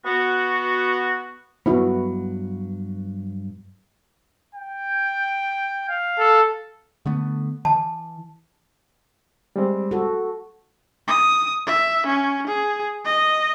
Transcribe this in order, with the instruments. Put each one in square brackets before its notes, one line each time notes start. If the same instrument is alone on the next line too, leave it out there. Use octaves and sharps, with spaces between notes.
[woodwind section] B3 F#4
[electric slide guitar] G2 F#3 [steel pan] B3 E4 F#4
[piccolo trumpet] G5
F5
[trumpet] A4
[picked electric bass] D3 A3 B3
[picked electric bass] E3 [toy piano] A5
[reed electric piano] G3 G#3 C4
[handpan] F#4 A4
[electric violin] D#6
E5
C#4
G#4
D#5